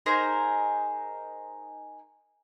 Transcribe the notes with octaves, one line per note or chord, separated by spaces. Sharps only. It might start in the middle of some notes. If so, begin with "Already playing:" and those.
D#4 G#4 A#4 C5